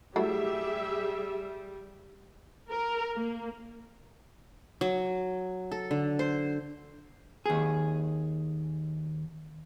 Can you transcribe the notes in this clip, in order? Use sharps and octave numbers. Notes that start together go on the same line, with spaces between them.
F#3 G3 A3 E4 G4 G#4 E5
A#4
A#3
F#3
A4
D3
C5
D#2 G#4